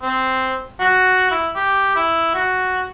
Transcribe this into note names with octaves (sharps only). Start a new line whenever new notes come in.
C4
F#4
E4
G4
E4
F#4